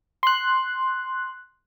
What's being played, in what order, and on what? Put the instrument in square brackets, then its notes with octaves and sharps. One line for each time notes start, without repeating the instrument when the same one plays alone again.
[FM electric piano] C6 F#6